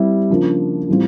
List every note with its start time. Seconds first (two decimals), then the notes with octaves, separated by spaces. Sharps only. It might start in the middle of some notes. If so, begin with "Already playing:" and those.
Already playing: G3 C4 E4 G4
0.30 C#3 F3 A#3 D4
0.88 A2 E3 G3 C4 F4